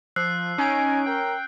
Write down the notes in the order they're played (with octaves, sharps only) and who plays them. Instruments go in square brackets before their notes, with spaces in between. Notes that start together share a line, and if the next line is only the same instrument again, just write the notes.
[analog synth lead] F3 [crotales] E6 F#6 C7
[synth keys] C#4 D7 [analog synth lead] D#4 [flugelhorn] G#5
[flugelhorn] A#4 [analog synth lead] G5